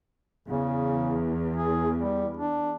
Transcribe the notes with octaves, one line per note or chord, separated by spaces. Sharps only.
E2 C#3
G#4
G3
D4